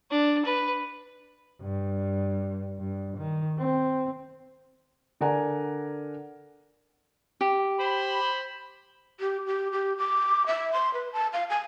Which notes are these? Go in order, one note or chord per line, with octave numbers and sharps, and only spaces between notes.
D4
B4
G2
G2
D#3
C4
D3 A#4 D5 F#5 G#5 A#5
G4
C5 B5
G4
G4
G4
D6
E5
C6
B4
A5
F5
G#5